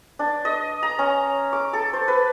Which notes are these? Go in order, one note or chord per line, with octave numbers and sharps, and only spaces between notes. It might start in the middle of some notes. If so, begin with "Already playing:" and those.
D4
D#5
A#5
C#4
D6
A4
C5
B4